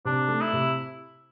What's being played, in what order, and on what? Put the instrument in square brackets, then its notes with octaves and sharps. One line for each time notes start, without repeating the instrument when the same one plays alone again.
[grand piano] C3 [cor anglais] D4
[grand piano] A3
[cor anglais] E4
[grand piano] C3